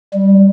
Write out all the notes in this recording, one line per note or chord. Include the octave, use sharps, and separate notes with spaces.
G3